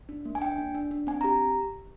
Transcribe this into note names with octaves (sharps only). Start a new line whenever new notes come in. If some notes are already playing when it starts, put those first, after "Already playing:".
D4
A#3
G#5
D4 G5
D4
D4
D4
C4 G#5
G4 A#5